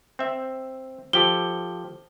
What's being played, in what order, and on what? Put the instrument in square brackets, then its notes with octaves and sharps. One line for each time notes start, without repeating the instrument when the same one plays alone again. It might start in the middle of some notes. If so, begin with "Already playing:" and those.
[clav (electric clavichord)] C4 E5
[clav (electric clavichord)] F3 G4 A4 [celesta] G7